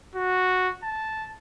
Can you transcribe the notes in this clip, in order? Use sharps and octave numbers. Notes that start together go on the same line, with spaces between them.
F#4
A5